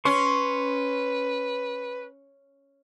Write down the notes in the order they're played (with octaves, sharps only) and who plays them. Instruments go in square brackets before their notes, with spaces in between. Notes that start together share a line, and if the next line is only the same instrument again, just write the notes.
[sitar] C#4 [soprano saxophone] B4 [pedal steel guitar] C6 C#6